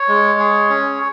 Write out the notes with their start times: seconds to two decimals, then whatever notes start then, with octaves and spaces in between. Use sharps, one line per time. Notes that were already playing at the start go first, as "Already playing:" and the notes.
Already playing: C#5
0.08 G#3
0.39 G#4
0.70 C#4